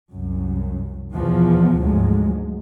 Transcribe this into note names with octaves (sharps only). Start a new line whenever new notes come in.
C2 F#2
E2 B2 E3 F3
D2 G#2 F3 F#3 G#3